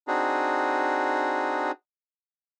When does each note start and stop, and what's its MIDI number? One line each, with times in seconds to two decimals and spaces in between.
0.08 1.71 60
0.08 1.71 62
0.08 1.71 63
0.08 1.71 66
0.08 1.71 68